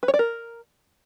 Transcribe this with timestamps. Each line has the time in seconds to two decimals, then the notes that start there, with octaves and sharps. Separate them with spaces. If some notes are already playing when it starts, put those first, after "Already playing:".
0.03 B4
0.08 C#5
0.14 D5
0.19 A#4